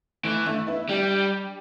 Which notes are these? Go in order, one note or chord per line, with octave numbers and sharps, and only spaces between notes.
E3 A3
A3 D4
B3 E4
G3 D4 G4